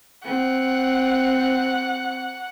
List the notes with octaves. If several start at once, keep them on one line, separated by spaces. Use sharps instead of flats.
C4 F#5